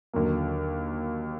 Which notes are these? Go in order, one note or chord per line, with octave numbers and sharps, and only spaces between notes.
D#2 D3 F#3 A#3